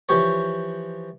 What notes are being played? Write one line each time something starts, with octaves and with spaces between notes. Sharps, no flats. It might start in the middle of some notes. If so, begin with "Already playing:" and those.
E3 F3 G4 C#5